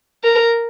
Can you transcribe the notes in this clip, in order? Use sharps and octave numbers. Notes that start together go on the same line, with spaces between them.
A#4